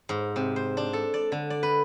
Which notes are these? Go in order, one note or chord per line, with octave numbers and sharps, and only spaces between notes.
G#2
C3
C5
D4
A4
D5
D3
D5
B4